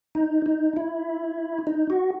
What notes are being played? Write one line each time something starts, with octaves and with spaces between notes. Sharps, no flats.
D#4
D#4
E4
D#4
F#4